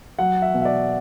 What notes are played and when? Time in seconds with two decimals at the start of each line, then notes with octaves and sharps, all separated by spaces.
0.19 F#3 F#5
0.42 E5
0.54 B2
0.61 E5
0.65 D5